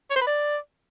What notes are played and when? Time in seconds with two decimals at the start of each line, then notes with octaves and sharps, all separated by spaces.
0.10 C#5
0.16 C5
0.21 B4
0.27 D5